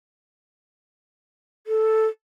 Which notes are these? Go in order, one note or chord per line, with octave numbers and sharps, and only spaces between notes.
A4